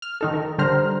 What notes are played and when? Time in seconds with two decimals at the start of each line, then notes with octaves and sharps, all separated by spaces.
0.02 F6
0.21 D#3 D#4 A4
0.34 A#4
0.58 D3 G3 C5 A#5 F6